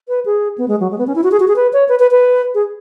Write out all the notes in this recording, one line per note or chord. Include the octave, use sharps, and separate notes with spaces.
B4
G#4
B3
G#3
F#3
G#3
B3
C#4
E4
F#4
G#4
F#4
G#4
B4
C#5
B4
B4
B4
G#4